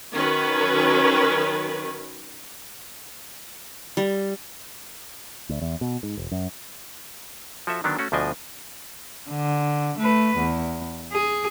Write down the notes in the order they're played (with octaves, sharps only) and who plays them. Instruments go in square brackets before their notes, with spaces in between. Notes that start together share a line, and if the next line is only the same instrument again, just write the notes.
[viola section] D#3 F#3 C#4 B4
[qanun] G3
[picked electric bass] D2
E2
B2
G#2
E1
F#2
[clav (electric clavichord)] F3 F#4 A4 E5
D3 D#3 F#3 B3 D4
A3 C#4 F#4
D2 B2 F3 D4 D#5 G#5
[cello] D3
A3 B4
E2
G#4